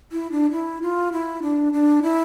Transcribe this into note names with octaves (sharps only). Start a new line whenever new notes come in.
E4
D4
E4
F4
E4
D4
D4
E4